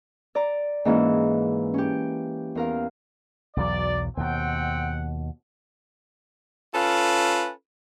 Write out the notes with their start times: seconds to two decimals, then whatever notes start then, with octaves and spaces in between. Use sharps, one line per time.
0.35 D5 A#5
0.85 G#2 E3 A#3 C#4
1.74 C#4 G4
2.55 E2 A#4 F5
3.57 B1 E2 F#3 D5
4.17 D#2 B2 C4 F#5 G5
6.72 C#4 F4 A4 B4